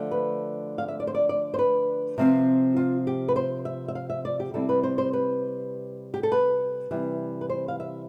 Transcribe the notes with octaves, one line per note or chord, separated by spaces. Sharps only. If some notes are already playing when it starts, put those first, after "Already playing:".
Already playing: D3 F3 A3
B4
F5
E5
D5
C5
D5
D5
C5
B4
C3 F3 C4 F4
F4
G4
B4
C5
E5
E5
F5
E5
D5
G4
C3 G3 C4 E4 A4
B4
C5
C5
B4
G4
A4
B4
C3 E3 G3
B4
C5
F5
E5